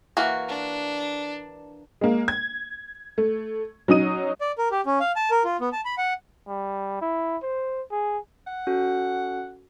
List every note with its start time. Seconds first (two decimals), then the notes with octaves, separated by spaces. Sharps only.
0.17 E3 A#3 F#4
0.48 D4
2.01 G#3 A#3
2.28 G#6
3.18 A3
3.88 F#3 C#4 D#4 D#6 D#7
4.41 D5
4.58 A#4
4.71 G4
4.86 C#4
5.00 F5
5.16 A5
5.31 A#4
5.44 F4
5.61 B3
5.72 A5
5.85 B5
5.98 F#5
6.48 G3
7.02 E4
7.43 C5
7.91 G#4
8.47 F#5
8.67 C#4 F#4 A4